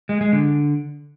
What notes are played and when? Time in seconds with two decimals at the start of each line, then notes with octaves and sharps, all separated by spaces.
0.09 G#3
0.21 G#3
0.33 D3